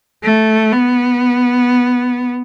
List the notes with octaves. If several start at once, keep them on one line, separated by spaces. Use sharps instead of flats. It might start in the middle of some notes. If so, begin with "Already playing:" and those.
A3
B3